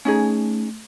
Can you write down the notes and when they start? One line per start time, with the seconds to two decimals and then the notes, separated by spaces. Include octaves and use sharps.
0.05 A3 C#4 D#4 G#4